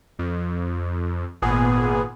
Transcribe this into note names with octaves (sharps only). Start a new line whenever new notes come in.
F2
G#1 A#2 B3 G#4